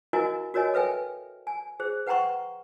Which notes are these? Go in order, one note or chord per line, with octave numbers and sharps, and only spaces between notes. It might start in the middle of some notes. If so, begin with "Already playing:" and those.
E4 F#4 A#4 D#5 F5 G#5
F#4 A#4 C#5 D#5 G#5
A4 B4 E5 G5 G#5
G#5
G#4 C5
B4 F#5 G5 A#5 C6 C#6